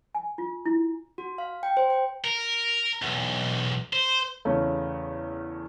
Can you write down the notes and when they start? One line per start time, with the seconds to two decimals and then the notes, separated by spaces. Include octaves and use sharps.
0.15 G#5
0.38 F4
0.66 E4
1.18 F#4
1.38 F5
1.63 G5
1.77 C5
1.90 G5
2.24 A#4
3.02 B1 E2
3.93 C5
4.45 E2 C#3 A3 C#4